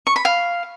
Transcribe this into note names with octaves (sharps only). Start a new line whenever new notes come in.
C#6
B5
F5